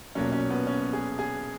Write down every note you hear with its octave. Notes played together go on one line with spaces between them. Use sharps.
B1 A#2 F#3 C#4
C#4
B3
C#4
G#4
G#4